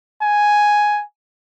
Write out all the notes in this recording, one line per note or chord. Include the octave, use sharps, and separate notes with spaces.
G#5